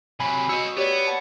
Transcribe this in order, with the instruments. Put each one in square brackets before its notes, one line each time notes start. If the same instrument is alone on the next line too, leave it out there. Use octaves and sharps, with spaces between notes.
[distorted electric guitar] C3 F#3 [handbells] G#5 B5
[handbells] F#4 E6 [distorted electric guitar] C#5 D#5
[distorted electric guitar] B3 [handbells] G4 C#5 D5
[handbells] F#5 A5 C#7